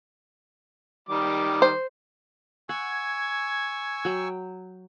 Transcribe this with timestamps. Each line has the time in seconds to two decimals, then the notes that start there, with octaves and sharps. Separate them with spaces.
1.09 D#3 G3 D6
1.62 C5
2.69 F#5 G#5 C#6 E6 G#6
4.05 F#3 G5